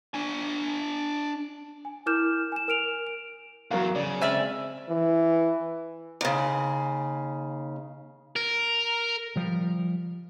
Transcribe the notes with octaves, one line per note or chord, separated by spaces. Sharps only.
D4 G#5
G#5
E4 A#4 D6 F6 G6 E7
G#5 E7
A#4 F6 D7 F7
D7
E2 F#3 A#4 F5
C#3 D5
G#3 C4 D5 E5 G#5 F6
E3
D#2 C#3
A#4
F3 G3